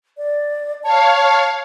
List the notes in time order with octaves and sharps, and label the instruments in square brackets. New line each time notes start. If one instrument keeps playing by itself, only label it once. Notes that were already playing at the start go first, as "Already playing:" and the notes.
[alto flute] D5
[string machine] C#5 F5 [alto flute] A5
[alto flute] A5